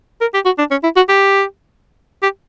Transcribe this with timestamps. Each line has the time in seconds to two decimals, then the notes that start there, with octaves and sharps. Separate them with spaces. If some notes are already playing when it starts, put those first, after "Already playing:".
0.21 A#4
0.34 G4
0.46 F#4
0.58 D4
0.71 C#4
0.83 E4
0.96 F#4
1.09 G4
2.23 G4